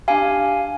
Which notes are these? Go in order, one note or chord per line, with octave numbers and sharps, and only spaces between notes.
D4 G4 F5 G#5